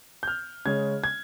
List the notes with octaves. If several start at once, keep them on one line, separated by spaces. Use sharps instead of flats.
G6
F6
C#3 G#3 C#4 G#6
G#6